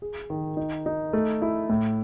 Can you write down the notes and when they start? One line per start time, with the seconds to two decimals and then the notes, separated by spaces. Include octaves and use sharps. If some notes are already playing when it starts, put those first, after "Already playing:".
0.02 G#4
0.30 D#3
0.57 D#4
0.86 D#4
1.13 A3
1.42 E4
1.69 A2